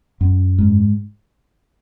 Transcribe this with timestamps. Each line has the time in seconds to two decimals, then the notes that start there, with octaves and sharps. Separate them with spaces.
0.21 F#2
0.58 G#2